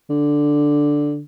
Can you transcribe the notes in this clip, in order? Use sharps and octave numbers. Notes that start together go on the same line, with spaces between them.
D3